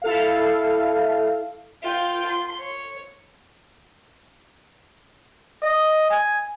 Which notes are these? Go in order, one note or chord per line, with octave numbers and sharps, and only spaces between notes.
E4 A4 F5
F4 G5
C6
C#5
D#5
G#5